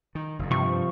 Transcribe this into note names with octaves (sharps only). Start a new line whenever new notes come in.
D#3
F#1 E2
G2 C3 F3 G3 C#6